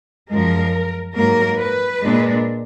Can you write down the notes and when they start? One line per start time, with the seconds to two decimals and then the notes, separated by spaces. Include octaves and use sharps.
0.30 F#2 F3 G#3 A#4
1.15 G#2 F#3 A#3 A#4
1.58 B4
2.01 A#2 G#3 D4